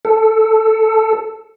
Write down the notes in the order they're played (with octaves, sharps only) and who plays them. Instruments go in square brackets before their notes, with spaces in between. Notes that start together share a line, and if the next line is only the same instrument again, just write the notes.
[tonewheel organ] A4